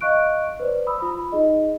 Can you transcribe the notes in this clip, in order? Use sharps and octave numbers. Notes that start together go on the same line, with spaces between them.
D#5 F5 C#6 F#6 D7
B4 C5 D5
B5 D#6 E6
F4 B5
D#4 G#4 D#5